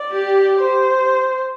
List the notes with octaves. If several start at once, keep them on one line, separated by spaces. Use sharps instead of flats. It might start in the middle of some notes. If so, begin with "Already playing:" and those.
Already playing: D5
G4
C5